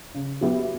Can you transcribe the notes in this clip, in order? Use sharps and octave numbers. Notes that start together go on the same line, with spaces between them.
C#3
F#3 B3 E4 G4